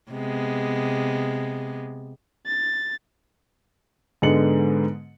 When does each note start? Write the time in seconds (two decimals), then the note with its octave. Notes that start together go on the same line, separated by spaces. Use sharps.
0.11 C3 G#3 B3
2.46 A6
4.22 G#2 D3 G#3 B3 C#7 F#7